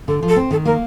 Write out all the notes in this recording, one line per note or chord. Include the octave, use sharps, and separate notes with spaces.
D3 A4
F3
A4
C4
D#3 A4
A#3 A#4